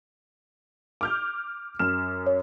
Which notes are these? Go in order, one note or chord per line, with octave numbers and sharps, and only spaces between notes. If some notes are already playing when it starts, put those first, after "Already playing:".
D6 F6 G6
F#2 F6 E7
C#5